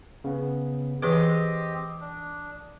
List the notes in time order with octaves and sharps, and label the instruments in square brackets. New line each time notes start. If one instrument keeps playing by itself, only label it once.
[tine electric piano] C#3 B3
[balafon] E3 G#4 B4 [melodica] C4 G4 D#5 [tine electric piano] D6 D#6
[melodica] D4